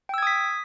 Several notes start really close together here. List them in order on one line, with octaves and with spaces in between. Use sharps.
G5 E6 G#6 D#6 B6